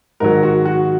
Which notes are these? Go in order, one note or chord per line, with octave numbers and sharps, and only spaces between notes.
G#2 D#3 F#3 A#4
F#4
F#4